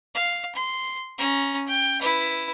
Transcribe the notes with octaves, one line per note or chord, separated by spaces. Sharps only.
F5
C6
C#4 A#5
G5
E4 B4